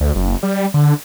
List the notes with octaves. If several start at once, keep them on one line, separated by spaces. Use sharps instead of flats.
D2
F#1
G3
D3